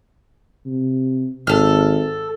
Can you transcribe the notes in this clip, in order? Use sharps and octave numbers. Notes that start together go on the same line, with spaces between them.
C3
G#1 A4 F6